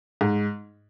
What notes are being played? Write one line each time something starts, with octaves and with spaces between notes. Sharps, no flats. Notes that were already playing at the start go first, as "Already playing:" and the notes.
G#2